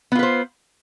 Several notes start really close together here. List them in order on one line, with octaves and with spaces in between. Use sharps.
B3 F4 B4 C5